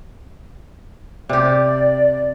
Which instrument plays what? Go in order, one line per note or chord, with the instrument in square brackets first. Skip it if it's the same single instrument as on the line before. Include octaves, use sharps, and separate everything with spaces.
[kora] C3 G4 [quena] D5